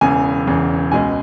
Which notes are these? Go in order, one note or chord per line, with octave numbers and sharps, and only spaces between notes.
E1 E2 C#3 G#5
E1 E2 C#3
C#2 B2 G#3 G#5